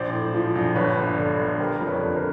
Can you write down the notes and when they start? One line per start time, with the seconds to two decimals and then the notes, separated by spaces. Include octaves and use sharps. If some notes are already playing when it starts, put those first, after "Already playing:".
Already playing: A#1 C5 D5
0.13 A2
0.34 F3
0.55 A#1
0.76 G1 B4 C#5
0.97 G2
1.18 D3
1.39 G1
1.59 G3 A#4 C5
1.81 F2
1.87 B4 C#5
2.01 D3
2.16 A#4 C5